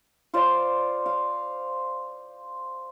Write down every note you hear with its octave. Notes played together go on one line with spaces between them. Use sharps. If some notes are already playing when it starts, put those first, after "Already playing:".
F4 C5 D5 F5
F5